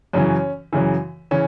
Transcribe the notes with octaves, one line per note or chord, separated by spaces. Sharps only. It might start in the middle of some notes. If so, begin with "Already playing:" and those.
F#2 C#3 E3 C#4
F#2 C#3 E3
C#3 E3 C#4